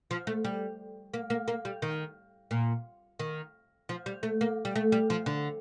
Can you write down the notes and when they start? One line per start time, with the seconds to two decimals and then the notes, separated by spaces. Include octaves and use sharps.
0.11 F3
0.27 A3
0.45 G3
1.14 A#3
1.30 A#3
1.48 A#3
1.65 G3
1.82 D#3
2.51 A#2
3.19 D#3
3.89 F3
4.06 G3
4.23 A3
4.41 A#3
4.65 G3
4.76 A3
4.92 G3
5.10 F3
5.26 D3